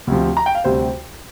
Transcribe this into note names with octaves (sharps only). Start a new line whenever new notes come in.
D2 C3 F3
A#5
G5
F5
D2 C3 G3 C5